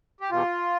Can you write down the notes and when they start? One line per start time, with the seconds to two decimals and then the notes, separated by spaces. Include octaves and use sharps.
0.21 G4
0.31 E2 B2 G3 F4